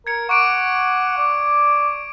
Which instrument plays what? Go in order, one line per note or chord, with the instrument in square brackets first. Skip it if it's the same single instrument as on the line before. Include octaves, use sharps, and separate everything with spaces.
[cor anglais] A#4 [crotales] G#6 C#7
[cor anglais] F#5 [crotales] C#6 D6 D7
[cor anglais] D5